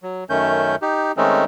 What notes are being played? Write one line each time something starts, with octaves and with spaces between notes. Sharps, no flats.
F#3
F#2 D#3 A3 C#4 G6
D#4 G4
D#3 G#3 A3 C4 C#4 D#4